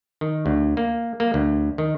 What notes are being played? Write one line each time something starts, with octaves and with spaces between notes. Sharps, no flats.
D#3
D2
A#3
A#3
D2
D#3